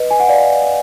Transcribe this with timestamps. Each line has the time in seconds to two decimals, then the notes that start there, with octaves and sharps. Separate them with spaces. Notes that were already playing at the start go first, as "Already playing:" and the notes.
Already playing: B4 D#5
0.11 G#5
0.20 F#5
0.28 D5 F5